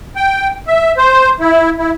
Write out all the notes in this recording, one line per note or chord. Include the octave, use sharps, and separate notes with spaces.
G5
E5
C5
E4
E4